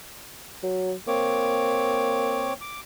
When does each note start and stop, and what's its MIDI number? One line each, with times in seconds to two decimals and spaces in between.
0.63 0.94 54
1.07 2.55 58
1.07 2.53 60
1.07 2.53 73
1.07 2.53 86
2.61 2.81 86